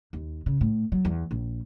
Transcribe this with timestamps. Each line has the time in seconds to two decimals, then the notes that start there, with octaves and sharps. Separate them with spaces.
0.13 D#2
0.46 C#3
0.61 A2
0.92 F#3
1.05 E2
1.31 A#1